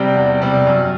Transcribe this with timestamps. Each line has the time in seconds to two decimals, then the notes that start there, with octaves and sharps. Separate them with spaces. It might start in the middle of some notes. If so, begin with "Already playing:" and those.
Already playing: C3 G3 G5
0.16 E2
0.42 C3 G3
0.67 F#2